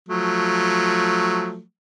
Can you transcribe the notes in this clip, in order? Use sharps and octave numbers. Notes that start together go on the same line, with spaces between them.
F3 F#3 A3